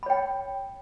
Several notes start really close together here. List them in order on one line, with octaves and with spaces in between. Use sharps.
B5 C#5 G5